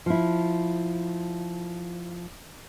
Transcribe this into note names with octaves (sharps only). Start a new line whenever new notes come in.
F3 E4